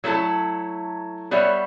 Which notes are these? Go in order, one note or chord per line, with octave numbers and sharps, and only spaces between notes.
F#3 A3 E4 A4
G3 B3 F#4 C#5 E5